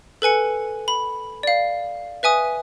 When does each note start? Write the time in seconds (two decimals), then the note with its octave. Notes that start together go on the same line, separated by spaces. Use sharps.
0.22 A4 B4 G#5 C#7
0.88 B5
1.43 D5 F5
2.23 B4 E5 G#5 D#6